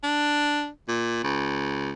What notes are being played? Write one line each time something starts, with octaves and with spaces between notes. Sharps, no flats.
D4
A#2
C#2